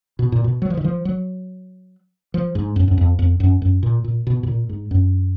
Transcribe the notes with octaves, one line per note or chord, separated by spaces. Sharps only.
B2
A#2
B2
F#3
F3
D#3
F3
F#3
F3
G#2
F#2
F#2
F2
F2
F#2
F#2
A#2
A#2
B2
B2
A#2
G#2
F#2